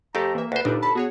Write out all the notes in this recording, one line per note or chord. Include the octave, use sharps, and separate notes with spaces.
F2 A3 G4 A4 A#5
E3 A#3 E5
D2 B4 C5
G1 A#2 D4 D#4
A4 A5 B5
B3 F#4 G#4 C#5